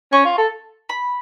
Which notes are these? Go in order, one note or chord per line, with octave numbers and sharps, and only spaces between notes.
C#4 C#6
F4
A4
B5